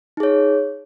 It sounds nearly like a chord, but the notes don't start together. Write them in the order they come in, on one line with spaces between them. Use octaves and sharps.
D#4 G#4 C#5